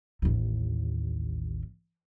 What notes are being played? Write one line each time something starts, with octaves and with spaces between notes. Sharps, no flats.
A1 D#2